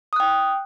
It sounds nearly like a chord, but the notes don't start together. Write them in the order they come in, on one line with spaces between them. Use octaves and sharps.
D#6 F#6 G5